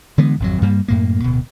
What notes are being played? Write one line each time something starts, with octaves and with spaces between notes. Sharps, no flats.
D3 E3 G#3 B3
G#1 F2 F#3
G2 G3 A#3
F#2 A2 A#3
D1 B2